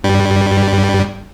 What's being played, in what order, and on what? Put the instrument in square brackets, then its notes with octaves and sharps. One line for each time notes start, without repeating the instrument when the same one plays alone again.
[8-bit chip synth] G2 G3